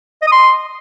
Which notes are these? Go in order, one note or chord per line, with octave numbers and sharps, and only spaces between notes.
D#5
D#6
C6